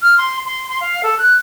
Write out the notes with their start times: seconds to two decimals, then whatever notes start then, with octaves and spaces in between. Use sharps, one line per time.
0.02 F6
0.18 C6
0.46 C6
0.68 C6
0.81 F5
1.03 A4
1.19 F#6